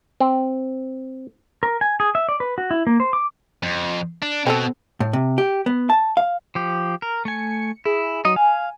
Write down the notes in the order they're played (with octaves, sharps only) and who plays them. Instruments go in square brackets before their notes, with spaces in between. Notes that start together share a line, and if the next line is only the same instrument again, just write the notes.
[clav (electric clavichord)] C4
[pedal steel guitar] A#4
G#5
G#4
E5
D5
B4
F#4
E4
A#3
C5
D6
[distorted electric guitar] F2
D4
[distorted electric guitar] B2 [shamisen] C4 G#4 A4
[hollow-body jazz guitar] A2
C3
G4
B3
A5
F5
[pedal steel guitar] F3 G4
A#4
[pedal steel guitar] A3 G#5 [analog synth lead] C#7
[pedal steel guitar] E4 [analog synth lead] G#4
[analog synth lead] F#3 [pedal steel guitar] D#4 D#5
[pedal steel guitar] F5 [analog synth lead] G#5